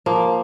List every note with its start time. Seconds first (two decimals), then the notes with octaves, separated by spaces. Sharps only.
0.06 F3 A#3